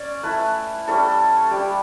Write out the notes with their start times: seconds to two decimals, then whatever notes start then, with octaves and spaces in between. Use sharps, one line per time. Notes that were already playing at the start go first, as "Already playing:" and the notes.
Already playing: C#4 D5
0.23 A3 E4 B4
0.88 G3 C#4 E4 A4
1.51 G3 D4 G4